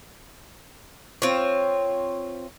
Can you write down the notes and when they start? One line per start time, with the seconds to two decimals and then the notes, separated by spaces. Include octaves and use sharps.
1.22 C4 F4 C#5